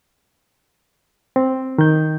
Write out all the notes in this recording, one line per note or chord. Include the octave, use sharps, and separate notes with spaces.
C4
D#3 G6